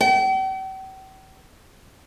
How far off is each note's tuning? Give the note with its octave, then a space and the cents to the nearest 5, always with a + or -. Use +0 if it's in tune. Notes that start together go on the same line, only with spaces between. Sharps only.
G5 -45